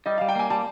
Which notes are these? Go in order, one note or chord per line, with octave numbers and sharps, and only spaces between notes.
G3 D#5
G3 F5
G5
A#3 G#5
G3 A5